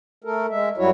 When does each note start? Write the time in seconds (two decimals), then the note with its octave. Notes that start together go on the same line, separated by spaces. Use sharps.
0.24 A3 A4 A#4
0.50 G#3 E5
0.78 F#2 F#3 G3 E4 F#4 C#5